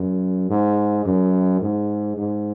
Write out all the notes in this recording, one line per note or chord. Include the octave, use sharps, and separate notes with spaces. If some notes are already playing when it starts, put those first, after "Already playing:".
Already playing: F#2
G#2
F#2
G#2
G#2